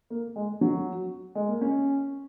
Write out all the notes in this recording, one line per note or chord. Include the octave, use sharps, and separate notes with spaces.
A#3
G#3
F#3
G#3
A#3
C#4